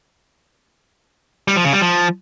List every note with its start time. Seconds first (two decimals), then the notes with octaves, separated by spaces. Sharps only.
1.48 G3
1.56 F3
1.65 C#3
1.73 G3
1.81 F3